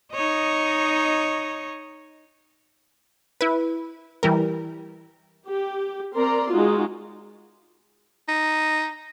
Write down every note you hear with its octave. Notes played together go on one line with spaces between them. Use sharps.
D#4 C#5 D#5
E4 B4
E3 G3 A#4
G4
C4 A#4 D5 A#5 C6
G#3 D#4 F4 F#4
D#4